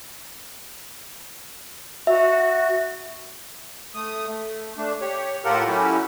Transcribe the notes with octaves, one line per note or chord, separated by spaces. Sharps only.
F#4 E5
A3 D#6
A3
A3 D4
G4 C#5
A2 F4 G4 A4 A#4 F#5
F#3 A3 C#4 E4 F#4 G4